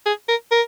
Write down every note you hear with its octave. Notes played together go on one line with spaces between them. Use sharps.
G#4
A#4
A#4